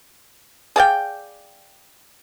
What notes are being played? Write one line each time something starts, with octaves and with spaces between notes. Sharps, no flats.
G#4 D5 F5 G5